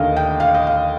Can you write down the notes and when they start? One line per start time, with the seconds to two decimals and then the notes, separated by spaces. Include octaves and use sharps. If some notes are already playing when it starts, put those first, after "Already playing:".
Already playing: D#2 D3 A3 D#5 F5
0.17 G5
0.40 F5
0.54 D#5
0.67 F5